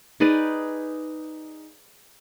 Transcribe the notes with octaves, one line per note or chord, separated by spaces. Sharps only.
D#4 G#4 B4 D5